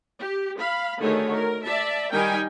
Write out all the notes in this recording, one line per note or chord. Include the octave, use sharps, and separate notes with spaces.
G4
F5 B5
D3 D#3 A3 F#4 G#4 C#5
A#4
D5 E5 A5
D#3 G3 D#4 A#4 G5 G#5